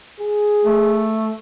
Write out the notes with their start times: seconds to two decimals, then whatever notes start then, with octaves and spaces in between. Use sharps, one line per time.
0.20 G#4
0.65 A3